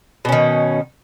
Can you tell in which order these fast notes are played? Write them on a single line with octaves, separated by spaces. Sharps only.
B2 C#4 D#3